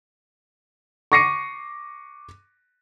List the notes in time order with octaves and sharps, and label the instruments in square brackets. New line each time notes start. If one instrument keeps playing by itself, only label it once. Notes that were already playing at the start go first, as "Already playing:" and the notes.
[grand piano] C#6 D6 A#6 C7 C#7 D#7